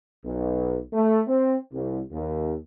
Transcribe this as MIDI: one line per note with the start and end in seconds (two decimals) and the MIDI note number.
0.25 0.78 35
0.94 1.21 57
1.27 1.56 60
1.73 2.00 36
2.12 2.55 39